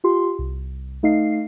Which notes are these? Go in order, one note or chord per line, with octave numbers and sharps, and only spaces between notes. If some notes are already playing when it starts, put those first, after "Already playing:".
F4 G4 C6
C2
A3 D#4 D#5 F5 C7